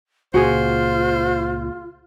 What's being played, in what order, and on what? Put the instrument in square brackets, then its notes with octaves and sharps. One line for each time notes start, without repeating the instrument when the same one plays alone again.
[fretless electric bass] C#2 A#2 [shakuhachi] F4 [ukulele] F#4 G#4 [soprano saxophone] C5